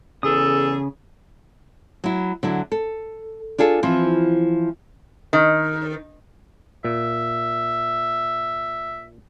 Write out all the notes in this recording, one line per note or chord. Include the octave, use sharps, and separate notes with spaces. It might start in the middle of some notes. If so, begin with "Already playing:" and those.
E2 C#3 G#4 A4 D#6
F#3 E4
D3 F#3 E4
A4
D4 F4 G#4 A4
E3 F3 C4 F4
D#3
A#2 E5